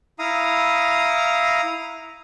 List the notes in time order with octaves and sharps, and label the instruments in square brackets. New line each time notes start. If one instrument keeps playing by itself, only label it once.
[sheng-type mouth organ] E4 F5 A#5 D#6